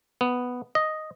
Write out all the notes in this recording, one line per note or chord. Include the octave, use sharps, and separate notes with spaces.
B3
D#5